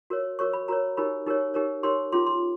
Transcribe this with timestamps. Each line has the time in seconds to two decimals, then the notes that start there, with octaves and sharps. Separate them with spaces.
0.10 F#4 A#4 C#5
0.39 F#4 A#4 C#5 C#6
0.53 B5
0.68 F#4 A#4 C#5 A#5
0.97 D#4 G4 A#4 C#5 B5
1.26 D#4 G4 A#4 C#5
1.54 D#4 G4 A#4 C#5
1.83 D#4 G4 A#4 C#5 C6
2.12 C#4 F4 G#4 C6
2.27 C6